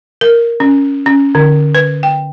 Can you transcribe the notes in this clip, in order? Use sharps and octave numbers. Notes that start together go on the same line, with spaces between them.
A#4
C#4
C#4
D3
B4
G5